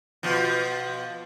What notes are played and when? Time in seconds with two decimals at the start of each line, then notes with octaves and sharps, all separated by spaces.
0.23 B2 F3